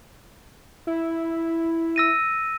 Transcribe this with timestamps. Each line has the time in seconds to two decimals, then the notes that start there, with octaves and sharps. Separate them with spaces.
0.87 E4
1.96 E6 A#6 D#7